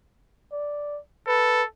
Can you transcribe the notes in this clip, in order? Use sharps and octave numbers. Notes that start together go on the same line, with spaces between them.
D5
A4 B4